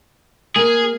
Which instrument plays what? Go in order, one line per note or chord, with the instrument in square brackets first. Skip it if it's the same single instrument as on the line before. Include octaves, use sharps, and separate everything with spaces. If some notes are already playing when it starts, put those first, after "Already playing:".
[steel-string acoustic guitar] A#3 [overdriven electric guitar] G#4